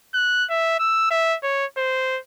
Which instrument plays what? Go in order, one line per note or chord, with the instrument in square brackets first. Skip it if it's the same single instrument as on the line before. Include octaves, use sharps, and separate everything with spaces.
[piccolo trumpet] F#6
E5
E6
E5
C#5
C5